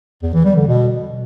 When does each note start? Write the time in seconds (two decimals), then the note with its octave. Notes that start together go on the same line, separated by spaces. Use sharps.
0.22 E2
0.33 E3
0.45 G3
0.56 D3
0.67 B2